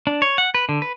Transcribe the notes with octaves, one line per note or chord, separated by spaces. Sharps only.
D4
C#5
F#5
B4
D3
B4